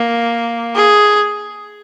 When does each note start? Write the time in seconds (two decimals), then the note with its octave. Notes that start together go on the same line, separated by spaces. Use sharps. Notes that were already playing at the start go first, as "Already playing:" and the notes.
Already playing: A#3
0.76 G#4